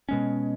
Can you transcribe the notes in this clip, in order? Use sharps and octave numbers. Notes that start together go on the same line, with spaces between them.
B2 G#3 C#4